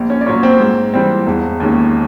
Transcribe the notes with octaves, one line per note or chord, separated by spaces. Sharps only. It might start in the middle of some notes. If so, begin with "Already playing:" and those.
Already playing: A#1
C#4 C#5
D5
A#2 F#3 C#4 C#5
C4 C5
G#2
E3 G3 C4
E1
D#2 D#3 G#3 C#4